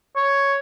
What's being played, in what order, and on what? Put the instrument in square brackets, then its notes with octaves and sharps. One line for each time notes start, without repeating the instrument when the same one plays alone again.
[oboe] C#5